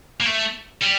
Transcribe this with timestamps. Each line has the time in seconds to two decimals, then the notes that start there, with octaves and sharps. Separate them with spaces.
0.21 A#3
0.26 A3
0.82 G3